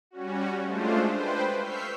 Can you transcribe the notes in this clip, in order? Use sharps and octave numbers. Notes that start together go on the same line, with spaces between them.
G3 C#4 F#4
G#3 A3 D4 F4 C5
B4 C5 G5
C#6 E6 F6 G6 B6 C7